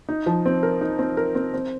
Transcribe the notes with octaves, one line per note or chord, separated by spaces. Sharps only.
D#4
F3
C4
A#4
D#4
C4
A#4
C4
C4